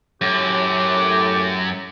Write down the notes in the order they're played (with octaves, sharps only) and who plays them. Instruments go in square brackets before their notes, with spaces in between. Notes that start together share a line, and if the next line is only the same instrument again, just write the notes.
[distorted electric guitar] F#2 [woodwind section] A2 G4